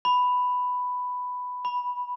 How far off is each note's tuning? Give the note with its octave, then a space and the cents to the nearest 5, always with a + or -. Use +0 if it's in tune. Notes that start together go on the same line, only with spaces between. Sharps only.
B5 +5
B5 -10